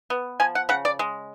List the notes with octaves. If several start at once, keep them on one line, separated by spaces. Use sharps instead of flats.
B3
F3 G#5
F#5
C#3 F#5
D5
G#3